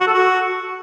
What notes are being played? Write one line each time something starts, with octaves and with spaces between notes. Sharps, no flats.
F#4
A4
F#4